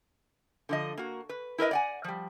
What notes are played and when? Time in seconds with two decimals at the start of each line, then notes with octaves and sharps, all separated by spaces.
0.69 D3 F3 D#5
0.97 A#3 F#4
1.29 B4
1.58 E4 A#4 B4 D#5
1.71 D5 F#5 G#5
2.04 F3 G3